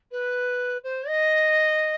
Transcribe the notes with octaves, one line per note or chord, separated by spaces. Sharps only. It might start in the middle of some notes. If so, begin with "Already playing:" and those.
B4
C5
D#5